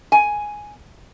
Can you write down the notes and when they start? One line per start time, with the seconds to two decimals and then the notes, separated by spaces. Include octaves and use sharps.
0.12 G#5